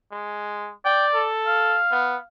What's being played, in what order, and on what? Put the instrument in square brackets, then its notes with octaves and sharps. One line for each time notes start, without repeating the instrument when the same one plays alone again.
[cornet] G#3
[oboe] D5 [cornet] G5
[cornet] A4
[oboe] F5
[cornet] B3